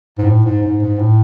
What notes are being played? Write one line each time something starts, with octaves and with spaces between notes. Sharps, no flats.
G#2
A2
G#2
G#2
G#2
A2